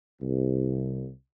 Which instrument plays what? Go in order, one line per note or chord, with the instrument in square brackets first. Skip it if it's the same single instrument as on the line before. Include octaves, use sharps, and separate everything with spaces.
[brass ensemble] C2